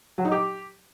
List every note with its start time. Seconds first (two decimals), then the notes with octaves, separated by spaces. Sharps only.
0.18 F#3
0.25 D#4
0.32 G4